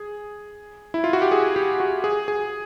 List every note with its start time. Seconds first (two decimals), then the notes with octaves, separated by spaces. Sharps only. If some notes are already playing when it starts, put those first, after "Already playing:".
Already playing: G#4
0.94 E4
1.04 F4
1.13 F#4
1.22 G4
1.32 G#4
1.56 G4
1.80 F#4
2.04 G#4
2.28 G#4